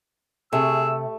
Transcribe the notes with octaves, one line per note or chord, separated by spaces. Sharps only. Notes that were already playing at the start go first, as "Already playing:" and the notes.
C3 A3 G#4 E6